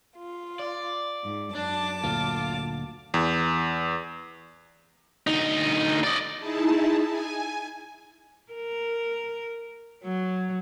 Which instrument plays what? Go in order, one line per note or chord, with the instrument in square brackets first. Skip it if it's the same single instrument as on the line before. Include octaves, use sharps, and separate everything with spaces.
[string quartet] F4
[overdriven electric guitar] D5
[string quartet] G#2
[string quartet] F#2 A5 D6 [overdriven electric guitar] D4
[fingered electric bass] D2 A#2 [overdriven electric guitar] F4
[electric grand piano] E2
[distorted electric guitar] D2 D#4
D5 D#5
[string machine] D#4 E4 G#4 A5
G#5
[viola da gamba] A#4
F#3